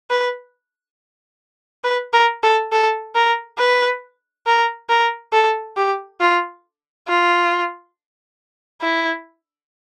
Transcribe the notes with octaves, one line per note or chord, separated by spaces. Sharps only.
B4
B4
A#4
A4
A4
A#4
B4
A#4
A#4
A4
G4
F4
F4
E4